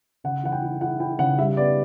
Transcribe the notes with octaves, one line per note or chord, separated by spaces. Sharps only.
C#3 F#5
E3 F#5
G5
E4
E4 F#5
E4 G5
C#3 F#5
G3 E5
B3 D5